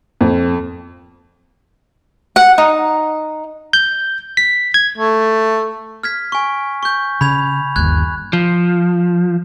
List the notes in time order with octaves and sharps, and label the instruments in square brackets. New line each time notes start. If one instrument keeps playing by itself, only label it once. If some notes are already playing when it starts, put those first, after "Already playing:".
[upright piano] F2
[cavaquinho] F#5
D#4
[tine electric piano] G6
B6
G#6
[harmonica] A3
[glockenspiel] F6 G#6 B6
G#5 C#6
C#6 G6
[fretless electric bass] C#3 [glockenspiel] B5 G#6 F7
[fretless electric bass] G1 D#2 [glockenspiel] F#6 G#6
[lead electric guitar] F3